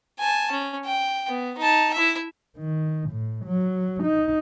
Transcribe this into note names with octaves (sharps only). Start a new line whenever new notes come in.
G#5 A5
C#4
G5
B3
D#4 A5
E4 E5
D#3
A2
F#3
D#4